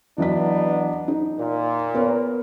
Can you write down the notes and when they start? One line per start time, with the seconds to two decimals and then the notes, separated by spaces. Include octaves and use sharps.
0.18 E3 F#3 B3 D4 D#4 B6
1.08 D#4
1.39 A#2
1.94 B3 A#4 C#5